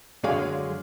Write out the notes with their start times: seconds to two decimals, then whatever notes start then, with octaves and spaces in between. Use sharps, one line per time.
0.24 F#2 D3 G#3 G#4 C#5 F5